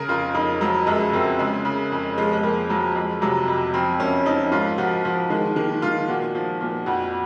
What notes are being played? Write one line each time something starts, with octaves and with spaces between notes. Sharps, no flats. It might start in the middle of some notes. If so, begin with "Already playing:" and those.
Already playing: C#3 A#4
F2 F4
F2 D#4
F3 F#3
F#2 G#3
F#2 C4
C#3 G#3
C#3
F2
F3 G#3
G#3
F2 A#3
F3 F#3
F2 G#3
C3 F#3
F2
F3 C4
F#2 C#4
F3 D#4
G#2 F4
F3 F#4
F3
D#3 G#3
D#3 A#3
D#3 F4
A#2 F#4
F3
A#2
F2 F#4